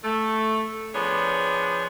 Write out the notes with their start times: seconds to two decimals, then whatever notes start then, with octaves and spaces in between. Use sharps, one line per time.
0.03 A3
0.94 F3 B3 D4 G#4 C#5